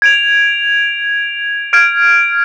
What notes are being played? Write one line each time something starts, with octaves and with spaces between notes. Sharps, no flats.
G#6 D7 F7
F6 G#6 D7